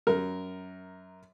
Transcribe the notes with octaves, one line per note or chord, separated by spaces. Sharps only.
F#2 A#4